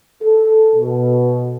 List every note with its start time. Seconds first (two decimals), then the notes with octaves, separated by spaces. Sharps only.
0.23 A4
0.76 B2